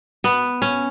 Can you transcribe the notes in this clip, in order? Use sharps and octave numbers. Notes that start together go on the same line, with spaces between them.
B3
C#4